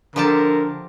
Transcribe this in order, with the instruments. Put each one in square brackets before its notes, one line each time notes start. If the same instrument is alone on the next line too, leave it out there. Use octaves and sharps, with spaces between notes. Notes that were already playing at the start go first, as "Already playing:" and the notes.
[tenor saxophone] D3 [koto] F3 G4 A5 [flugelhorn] A#4